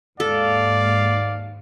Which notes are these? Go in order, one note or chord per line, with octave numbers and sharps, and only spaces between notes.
D#2 G#2 A#3 A4 D5 F5